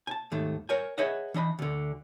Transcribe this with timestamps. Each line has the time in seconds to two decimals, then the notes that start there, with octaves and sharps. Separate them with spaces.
0.07 G#5 A5
0.32 D#2 G#2 D#3 A3
0.69 A#4 C#5 G#5
0.98 G#4 B4 C#5 D#5 E5 F#5
1.34 E3 D4 D#5 B5
1.59 D2 D3